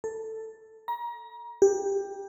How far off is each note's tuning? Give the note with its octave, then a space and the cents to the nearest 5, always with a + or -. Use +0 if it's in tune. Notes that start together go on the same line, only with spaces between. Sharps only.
A4 +10
A#5 +30
G4 +15